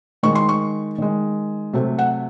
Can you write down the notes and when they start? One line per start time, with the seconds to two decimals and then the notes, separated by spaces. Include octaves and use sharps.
0.23 D#3 G#3 C#6
0.35 C6
0.49 C#6
0.98 D#3 G#3
1.73 C3 F#3 A3
1.99 F#5